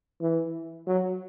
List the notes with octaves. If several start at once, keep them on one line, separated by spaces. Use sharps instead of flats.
E3
F#3